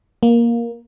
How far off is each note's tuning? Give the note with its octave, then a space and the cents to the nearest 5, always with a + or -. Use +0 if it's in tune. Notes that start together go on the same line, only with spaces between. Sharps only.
A#3 +10